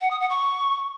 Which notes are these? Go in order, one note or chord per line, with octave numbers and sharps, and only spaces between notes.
F#5
D#6
F#5
C#6